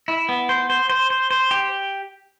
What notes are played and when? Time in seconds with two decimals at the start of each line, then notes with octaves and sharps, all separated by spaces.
0.08 E4
0.29 B3
0.49 C5
0.70 C5
0.89 C5
1.10 C5
1.31 C5
1.51 G4